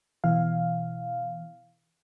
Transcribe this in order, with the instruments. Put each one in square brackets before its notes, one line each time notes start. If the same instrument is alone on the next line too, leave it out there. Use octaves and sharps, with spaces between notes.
[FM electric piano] B2 E3 F5